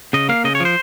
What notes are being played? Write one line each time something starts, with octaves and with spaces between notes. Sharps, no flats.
C#3 D#5
A#3 F5
C#3 D#5
C#5
F3
C5